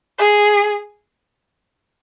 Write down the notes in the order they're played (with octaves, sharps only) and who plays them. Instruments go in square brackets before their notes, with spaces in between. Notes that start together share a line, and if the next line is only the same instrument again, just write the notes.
[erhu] G#4